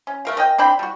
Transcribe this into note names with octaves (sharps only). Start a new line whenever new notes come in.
C#4
A3 A#4 F5
A#4 D#5 G5
C4 D4 G5 B5
G3 F#4